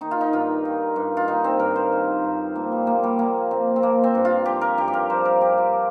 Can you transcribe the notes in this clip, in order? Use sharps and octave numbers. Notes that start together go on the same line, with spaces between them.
D#3 D#4
F4
D#4
G2 F4
D#3
G2
F4
D#3 D#4
C4
G2 A#4
C5
D#3
G2
F3 A#3
G3
A#2 A#3
G3
F3 A#3
A#2 C4
C4
F3 A#3
C4
G2
F4
F3 G4
A#4
G2 G4
G4
A#4
F3 C5
A#4
G2 G4
F4
F3